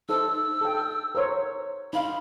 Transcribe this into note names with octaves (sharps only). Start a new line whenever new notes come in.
D#4 A4 C5 E6
A4 G5
A#4 C5 C#5
D#4 F5 B5